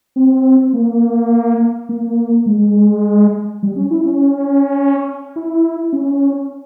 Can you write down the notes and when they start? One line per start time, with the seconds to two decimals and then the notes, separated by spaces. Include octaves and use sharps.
0.16 C4
0.73 A#3
1.89 A#3
2.46 G#3
3.63 G3
3.76 C#4
3.91 E4
4.05 C#4
5.36 E4
5.93 C#4